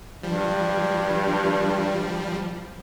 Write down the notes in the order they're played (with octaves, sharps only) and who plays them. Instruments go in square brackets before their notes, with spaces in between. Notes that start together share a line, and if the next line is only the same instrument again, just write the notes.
[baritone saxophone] G2 [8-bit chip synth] F3 G3